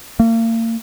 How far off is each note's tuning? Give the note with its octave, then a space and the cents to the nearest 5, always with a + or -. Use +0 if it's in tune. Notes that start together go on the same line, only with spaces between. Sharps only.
A#3 -40